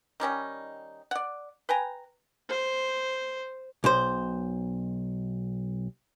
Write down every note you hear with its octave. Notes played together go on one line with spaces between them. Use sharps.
D#3 G3 C#4 D#4
D5 F#5
B4 G5 G#5 A#5
C5
B1 C5